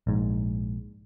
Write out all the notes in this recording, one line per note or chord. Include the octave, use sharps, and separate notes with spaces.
A#1 G#2